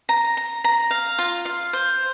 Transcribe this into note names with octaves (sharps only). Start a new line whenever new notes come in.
A#5
A#5
A#5
F5
F4
F5
C5